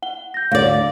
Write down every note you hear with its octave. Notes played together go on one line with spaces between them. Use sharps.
F#5 G7
G6 A#6
D2 D5 F5